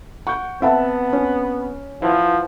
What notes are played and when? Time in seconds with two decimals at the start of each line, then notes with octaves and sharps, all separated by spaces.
0.27 F#5 C#6 G6
0.62 B3 C4 E5 F#5 A5
1.13 C#4
2.02 F3 E4 B4 F#5